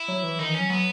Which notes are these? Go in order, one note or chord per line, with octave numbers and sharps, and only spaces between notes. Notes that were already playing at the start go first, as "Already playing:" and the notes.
Already playing: E4
F#3
E3
D#3 D#4
E3
C#4
F#3
F#3 B3